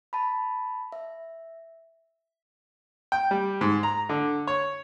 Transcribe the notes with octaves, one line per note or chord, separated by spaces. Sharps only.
A5 B5
E5
G5
G3
G#2
A#5
D3
C#5